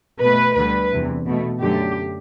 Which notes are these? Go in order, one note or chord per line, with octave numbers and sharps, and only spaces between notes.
B2 A3 B4
D2 D3 G3 B4
E2 C3 E3
B2 A3
F#2 D3 A3 G4